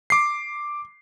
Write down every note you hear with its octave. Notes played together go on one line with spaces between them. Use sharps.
D6 C7